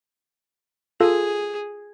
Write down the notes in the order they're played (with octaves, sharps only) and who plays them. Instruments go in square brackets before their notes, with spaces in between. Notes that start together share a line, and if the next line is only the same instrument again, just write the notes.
[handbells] F4 A4 F5 [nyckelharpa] G#4